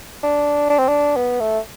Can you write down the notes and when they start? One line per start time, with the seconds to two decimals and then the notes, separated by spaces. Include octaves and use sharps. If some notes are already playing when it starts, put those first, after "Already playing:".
0.23 D4
0.70 D4
0.79 C4
0.88 D4
1.16 B3
1.40 A3